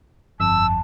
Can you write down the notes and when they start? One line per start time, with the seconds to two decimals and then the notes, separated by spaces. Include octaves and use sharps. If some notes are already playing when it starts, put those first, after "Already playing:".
0.40 G1 F2 A5 E6